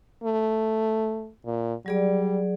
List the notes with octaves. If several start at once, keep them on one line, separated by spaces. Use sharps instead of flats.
A3
A#2
F#3 G3 G#4 D5